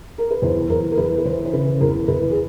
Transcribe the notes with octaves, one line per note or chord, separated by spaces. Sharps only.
A#4
B4
E2 C5
E2 A#4
A#4
E2 B4
B4
E3 C5
C5
C#3 B4
E2 A#4
E2 B4
G#4